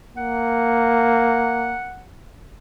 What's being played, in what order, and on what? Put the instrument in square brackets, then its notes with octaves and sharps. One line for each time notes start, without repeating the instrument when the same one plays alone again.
[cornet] A#3 [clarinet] F#5